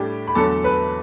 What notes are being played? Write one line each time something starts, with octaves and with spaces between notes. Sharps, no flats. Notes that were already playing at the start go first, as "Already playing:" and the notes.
Already playing: A2 G3 D4 G4
B5
E2 D3 F#3 A3 A4 A5
B4 B5